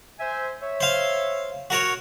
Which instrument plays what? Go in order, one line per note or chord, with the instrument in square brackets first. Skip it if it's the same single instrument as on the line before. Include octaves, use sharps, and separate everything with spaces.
[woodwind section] C5 E5 G#5
C#5 E5
[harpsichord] C5 F5
F#4 A#4 C#5